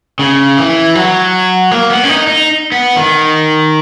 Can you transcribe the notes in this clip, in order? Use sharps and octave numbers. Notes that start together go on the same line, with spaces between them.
C#3
E3
F#3
A#3
B3
C#4
D#4
D#4
B3
D#3